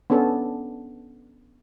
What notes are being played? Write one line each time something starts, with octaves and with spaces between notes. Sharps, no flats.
B3 C#4 D4 A4